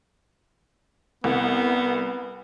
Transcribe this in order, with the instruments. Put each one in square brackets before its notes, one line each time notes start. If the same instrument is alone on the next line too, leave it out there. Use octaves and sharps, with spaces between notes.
[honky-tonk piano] C2 [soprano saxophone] B3